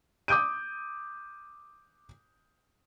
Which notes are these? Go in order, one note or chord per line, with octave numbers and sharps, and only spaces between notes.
D6 D#6 G6 D7 D#7